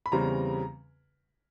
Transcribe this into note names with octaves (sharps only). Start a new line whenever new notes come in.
B5
E2 C#3 E3 G3 C4 A#5